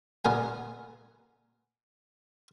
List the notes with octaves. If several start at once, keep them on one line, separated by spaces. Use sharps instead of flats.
A#2 B3 A#4 G#5